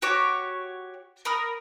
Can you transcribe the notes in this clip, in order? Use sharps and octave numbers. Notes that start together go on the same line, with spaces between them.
F#4 G4 C#5 D6
A#4 B5 D#6 F6